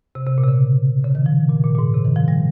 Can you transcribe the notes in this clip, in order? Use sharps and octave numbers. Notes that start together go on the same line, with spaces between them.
C3
C3
A#2
C3
C#3
C#3
D#3
F3
A#2
A#2
A#2
G#2
C3
D#3
F3
G3